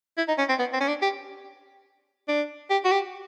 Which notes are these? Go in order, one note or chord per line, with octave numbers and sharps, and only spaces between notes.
E4
D#4
C#4
C4
B3
C4
C#4
D4
G4
D4
G4
F#4
G4